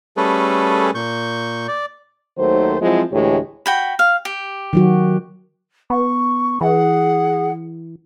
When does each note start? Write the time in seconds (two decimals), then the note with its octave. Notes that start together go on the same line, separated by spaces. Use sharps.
0.17 G3 A3 C#4 G#4 A4 B4
0.95 A#2 C#6 G6
1.68 D5
2.38 D#2 D#3 F#3 A3 C5
2.82 F3 F#3 G#3 C4 E4 F4
3.12 D2 A2 E3 G#3 G4 C#5
3.66 F#4 G5 B5
3.99 F5
4.25 G4
4.73 D#3 F#3 F#4
5.90 B3 C#6
6.61 E3 G#4 F#5